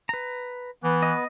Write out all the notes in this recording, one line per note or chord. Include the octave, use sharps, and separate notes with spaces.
B4 A#5
E3 B3
D#5